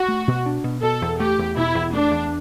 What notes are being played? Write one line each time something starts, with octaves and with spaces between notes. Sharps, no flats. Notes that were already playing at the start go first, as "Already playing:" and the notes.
Already playing: F#4
A3
B2
D4
B2
B2 A4
E2
A3 G4
E2
B2 E4
E2
A3 D4
E2